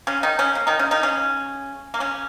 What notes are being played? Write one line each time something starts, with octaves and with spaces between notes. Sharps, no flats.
C#3 C#4
D#3 D#4
C#3 C#4
A#3
D#3 D#4
C#3 C#4
D#3 D#4
C#3 C#4
A#3
C#3 C#4